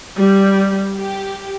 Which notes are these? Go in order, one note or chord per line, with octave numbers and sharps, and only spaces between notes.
G3
G4